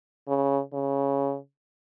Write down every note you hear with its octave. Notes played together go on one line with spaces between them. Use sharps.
C#3
C#3